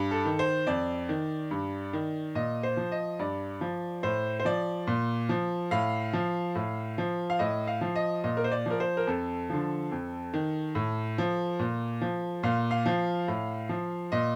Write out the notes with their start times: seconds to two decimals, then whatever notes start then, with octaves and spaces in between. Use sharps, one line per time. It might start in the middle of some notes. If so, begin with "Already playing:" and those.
Already playing: G2
0.11 A4
0.25 D#3
0.39 C5
0.67 F2 D5
1.09 D#3
1.51 G2
1.93 D#3
2.35 A#2 D#5
2.63 C5
2.77 F3
2.92 D#5
3.19 G2 D5
3.61 F3
4.03 A2 C5
4.40 C5
4.45 F3 D5
4.87 A#2
5.29 F3
5.71 A2 F5
6.13 F3
6.55 A2
6.98 F3
7.30 F5
7.39 A2 D#5
7.67 F5
7.81 F3
7.96 D#5
8.24 A#2 D#5
8.37 A#4
8.44 C5
8.52 D5
8.66 F3 A#4
8.80 C5
8.97 A#4
9.07 F2 A4
9.50 D3 F3
9.92 F2
10.34 D#3
10.75 A2
11.18 F3
11.59 A#2
12.01 F3
12.43 A#2 F5
12.71 F5
12.86 F3
13.28 A2
13.69 F3
14.12 A#2 D#5